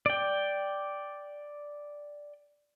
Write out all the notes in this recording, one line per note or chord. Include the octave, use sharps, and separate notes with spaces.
D5 G5